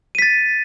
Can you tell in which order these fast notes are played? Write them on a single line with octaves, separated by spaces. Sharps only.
D#7 B6 A6